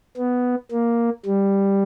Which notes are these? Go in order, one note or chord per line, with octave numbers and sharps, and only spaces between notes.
B3
A#3
G3